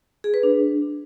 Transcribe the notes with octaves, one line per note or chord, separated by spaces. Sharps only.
G#4
B4
D4